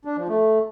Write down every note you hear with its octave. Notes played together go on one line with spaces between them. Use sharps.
D4
F3
A3